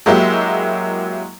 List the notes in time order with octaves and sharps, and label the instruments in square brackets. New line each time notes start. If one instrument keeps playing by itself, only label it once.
[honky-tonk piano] F#3 G#3 A#3 E4 G4